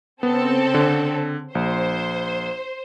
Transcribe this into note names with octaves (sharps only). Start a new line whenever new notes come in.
C#3 B3 C4 A4
D3
A#1 C5